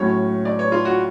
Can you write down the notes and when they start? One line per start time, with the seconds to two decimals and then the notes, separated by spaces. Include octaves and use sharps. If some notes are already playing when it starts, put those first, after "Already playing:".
Already playing: A2 F#3 C#4 C#5
0.45 D5
0.59 C#5
0.72 F4
0.85 F#4